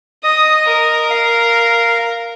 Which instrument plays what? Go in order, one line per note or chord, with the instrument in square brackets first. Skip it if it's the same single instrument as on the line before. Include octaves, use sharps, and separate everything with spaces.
[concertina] D#5 [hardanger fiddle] D#6
[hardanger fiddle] A#4
[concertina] F5